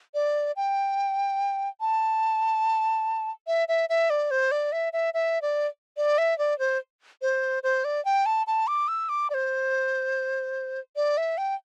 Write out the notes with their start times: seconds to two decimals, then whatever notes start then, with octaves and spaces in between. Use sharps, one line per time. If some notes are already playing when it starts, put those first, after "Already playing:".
0.14 D5
0.56 G5
1.81 A5
3.47 E5
3.68 E5
3.89 E5
4.10 D5
4.31 C5
4.51 D5
4.72 E5
4.93 E5
5.14 E5
5.42 D5
5.97 D5
6.18 E5
6.39 D5
6.59 C5
7.22 C5
7.63 C5
7.84 D5
8.05 G5
8.26 A5
8.47 A5
8.67 D6
8.88 E6
9.09 D6
9.30 D5
9.34 C5
10.96 D5
11.17 E5
11.38 G5